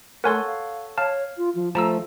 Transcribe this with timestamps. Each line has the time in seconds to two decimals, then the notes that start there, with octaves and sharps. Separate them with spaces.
0.24 A3 A4 A#4 C#5 F#5 G#5 C6
0.45 F5
0.98 C#5 F5 A5
1.37 F4
1.55 F3
1.75 F3 A3 A5 A#5 E6